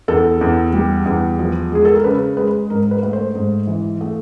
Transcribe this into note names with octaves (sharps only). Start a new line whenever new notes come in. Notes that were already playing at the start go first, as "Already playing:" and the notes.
E2 A4
E2
G3
E2
F3
G#3 G#4
A4
A#4
C#3 B4
G#3 B4
G#2 A#4
B4
A3
C5
G#2
E3
A3